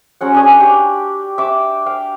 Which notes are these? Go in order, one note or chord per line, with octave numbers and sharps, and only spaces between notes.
F#3 G#3 C#4 F#5
D4 G#4 C#5
G4 D5
E5 D6
F5 G5